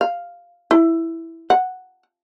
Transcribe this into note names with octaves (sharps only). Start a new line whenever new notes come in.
F5
E4
F#5